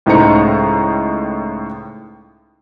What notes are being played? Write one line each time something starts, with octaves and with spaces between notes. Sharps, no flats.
C#2 A2 D#4 C5 A#5 C#7